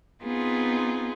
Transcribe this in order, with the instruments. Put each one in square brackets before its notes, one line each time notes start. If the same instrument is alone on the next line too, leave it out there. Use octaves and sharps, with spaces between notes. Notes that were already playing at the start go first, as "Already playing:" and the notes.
[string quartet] B3 C4 D#4 F4 G#4